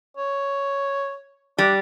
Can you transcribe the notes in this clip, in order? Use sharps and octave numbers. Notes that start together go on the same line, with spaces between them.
C#5
G3 D4